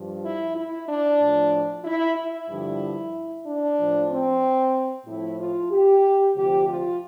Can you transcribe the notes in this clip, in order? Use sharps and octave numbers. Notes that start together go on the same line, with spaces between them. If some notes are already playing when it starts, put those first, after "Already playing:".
Already playing: G2 F3
E4
E4
D4
A2 F3
E4
E4
G2 D3 F3
D4
A2 F3
C4
A2 F3 E4
F4
G4
D2 C3 F3 G4
F4